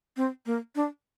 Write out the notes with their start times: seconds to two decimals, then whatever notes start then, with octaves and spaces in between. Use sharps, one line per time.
0.17 C4
0.46 A#3
0.76 D4